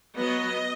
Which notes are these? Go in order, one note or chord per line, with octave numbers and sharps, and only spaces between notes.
F#3 B3 D#5